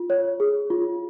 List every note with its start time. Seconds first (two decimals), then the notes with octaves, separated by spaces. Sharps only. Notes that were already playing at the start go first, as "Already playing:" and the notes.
Already playing: F4
0.10 C#5
0.40 G#4
0.70 F4